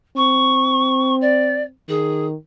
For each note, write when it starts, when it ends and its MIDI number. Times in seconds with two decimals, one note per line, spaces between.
0.17 1.71 60
0.17 1.15 85
1.21 1.63 74
1.89 2.36 51
1.89 2.25 68